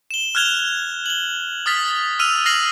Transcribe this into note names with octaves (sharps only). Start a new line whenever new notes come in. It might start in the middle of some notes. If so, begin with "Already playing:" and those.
E7 G7
F6 F#6 G#6 F7 G7
F#7 G7
D#6 F6 A6 B6
E6 F6 D#7 F7
F6 A#6 C7 D#7 F#7